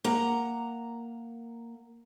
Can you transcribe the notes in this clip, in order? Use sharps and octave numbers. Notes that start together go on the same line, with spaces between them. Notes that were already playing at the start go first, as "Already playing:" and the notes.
A#3 F#5 A#5